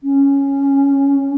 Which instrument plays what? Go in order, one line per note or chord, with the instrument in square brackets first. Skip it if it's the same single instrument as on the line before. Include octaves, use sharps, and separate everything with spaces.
[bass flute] C#4